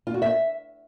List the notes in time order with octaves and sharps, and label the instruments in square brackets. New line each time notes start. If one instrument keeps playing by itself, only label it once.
[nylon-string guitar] F4
F#4
E5